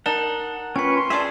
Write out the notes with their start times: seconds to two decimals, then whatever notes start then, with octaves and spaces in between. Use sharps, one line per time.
0.06 D#4 A#4 D5 F#5 A5
0.76 C#4 F4 B4 G5 C#6 B6
0.96 C6
1.10 G#4 D5 E5 A5